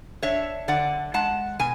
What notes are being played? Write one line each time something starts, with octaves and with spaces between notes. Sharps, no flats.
D4 C#5 E5
D3 D5 F#5
G#3 F#5 A5
B2 G#5